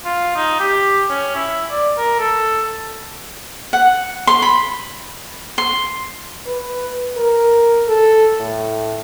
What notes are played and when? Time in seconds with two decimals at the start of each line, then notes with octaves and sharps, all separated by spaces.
0.05 F4
0.36 D#4
0.59 G4
1.09 C#4
1.35 E4
1.70 D5
1.97 A#4
2.19 A4
3.73 F#5
4.27 C6
4.42 B5
5.58 C6
6.47 B4
7.17 A#4
7.88 A4
8.40 A2